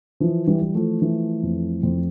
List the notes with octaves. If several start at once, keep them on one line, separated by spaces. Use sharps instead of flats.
E3 F3
E3 G3
E3
F3 A3
E3
F2
F2